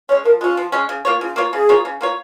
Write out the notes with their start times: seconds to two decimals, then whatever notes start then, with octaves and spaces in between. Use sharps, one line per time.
0.09 G#3 C#4 C#5
0.25 F3 A#4
0.40 G#3 C#4 F4
0.57 F3
0.72 G#3 C#4
0.89 C#3
1.05 A#3 F4 C#5
1.20 C#3 F4
1.36 A#3 F4 C#5
1.52 C#3 G#4
1.69 A#3 F4 C#5
1.85 C#3
2.01 A#3 F4 C#5